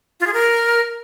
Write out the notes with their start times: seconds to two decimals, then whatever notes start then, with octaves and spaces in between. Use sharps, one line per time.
0.20 F4
0.27 G#4
0.33 A#4